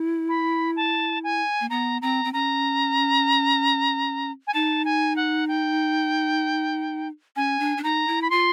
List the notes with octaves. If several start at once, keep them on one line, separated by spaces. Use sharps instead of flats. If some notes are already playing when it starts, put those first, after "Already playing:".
Already playing: E4
B5
A5
G#5
A#3
B3 A#5
C4 A#5
C4
C#4 A#5
G#5
D#4 A5
G#5
F#5
G5
C#4 G#5
D4
D4
D#4 A#5
E4
B5
F4 C6